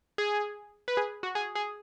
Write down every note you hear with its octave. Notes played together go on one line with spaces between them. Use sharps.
G#4
B4
G#4
F#4
G#4
G#4